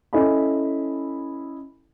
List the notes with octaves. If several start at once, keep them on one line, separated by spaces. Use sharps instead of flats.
C#4 E4 A4 D#5 G#5 B5